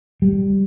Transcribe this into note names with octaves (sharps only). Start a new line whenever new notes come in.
G3